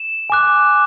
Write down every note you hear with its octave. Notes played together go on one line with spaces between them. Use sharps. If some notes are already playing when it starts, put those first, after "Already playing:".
Already playing: E7
G#5 D6 F#6